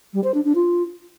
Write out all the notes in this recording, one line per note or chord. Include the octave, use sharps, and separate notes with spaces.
G3
C5
D4
D4
F4